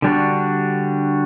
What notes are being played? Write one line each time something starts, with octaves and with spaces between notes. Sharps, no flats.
D3 G3 D4 F#4